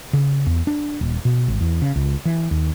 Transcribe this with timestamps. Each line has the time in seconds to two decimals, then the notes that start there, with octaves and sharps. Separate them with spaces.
0.13 C#3
0.47 E2
0.67 D4
1.01 D#1
1.25 B2
1.48 G#1
1.61 E2
1.82 C#3
1.96 C#2
2.25 E3
2.51 D#2